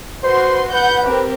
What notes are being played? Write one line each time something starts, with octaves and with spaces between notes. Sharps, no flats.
F#4 B4 C5 C6
B4 F#5 G6
C4 G4 A#4